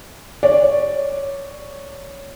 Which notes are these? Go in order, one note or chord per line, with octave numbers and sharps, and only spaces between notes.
C#5 D5